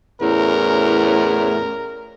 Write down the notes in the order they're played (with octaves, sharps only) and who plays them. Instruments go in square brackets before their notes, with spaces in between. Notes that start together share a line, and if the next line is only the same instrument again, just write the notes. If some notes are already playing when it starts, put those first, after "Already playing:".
[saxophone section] E2 A2 C#4 [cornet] A#4